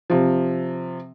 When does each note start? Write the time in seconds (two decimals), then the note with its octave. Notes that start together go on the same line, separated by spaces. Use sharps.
0.10 C3 F3